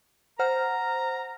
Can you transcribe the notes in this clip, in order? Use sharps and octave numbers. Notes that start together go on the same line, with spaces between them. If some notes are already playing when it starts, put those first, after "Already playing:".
C5 F#5 A#5 F6